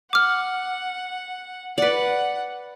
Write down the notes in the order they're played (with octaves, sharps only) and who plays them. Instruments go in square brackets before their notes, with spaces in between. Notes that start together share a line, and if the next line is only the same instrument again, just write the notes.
[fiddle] F#5 [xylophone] D6 F6
[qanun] B4 D5 [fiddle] F#5